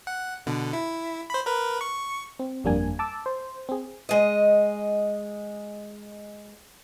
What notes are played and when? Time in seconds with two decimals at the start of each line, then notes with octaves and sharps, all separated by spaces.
0.07 F#5
0.46 B2 D3
0.73 E4
1.30 C5 B5
1.46 A#4 B4
1.81 C#6
2.39 C4
2.64 G1 F2 G3 A#3 D4 G#5
2.99 A5 D6 E6
3.26 C5
3.69 C4 G#4
4.09 G#3 D#5